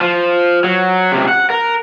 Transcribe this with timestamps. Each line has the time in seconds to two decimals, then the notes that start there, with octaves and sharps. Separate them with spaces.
0.01 F3
0.64 F#3
1.12 C#2 C3
1.28 F#5
1.50 A#4